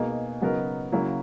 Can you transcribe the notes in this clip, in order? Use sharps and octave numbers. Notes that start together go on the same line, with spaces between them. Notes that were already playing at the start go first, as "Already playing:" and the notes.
Already playing: B2 A#3 D#4 G#4
C#3 F#3 B3 D#4 A#4
C#3 F#3 A#3 E4